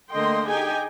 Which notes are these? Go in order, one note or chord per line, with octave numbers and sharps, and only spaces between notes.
D3 A3 A#3 D#5 G5 C6
D#4 G4 G#4 G5 G#5